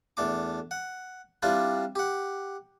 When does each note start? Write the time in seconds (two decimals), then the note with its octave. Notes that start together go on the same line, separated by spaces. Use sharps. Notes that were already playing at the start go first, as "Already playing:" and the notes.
0.17 E2 A3 D4 D6
0.71 F#5
1.42 G3 C4 D4 E4 F4 B4
1.95 G4 F#5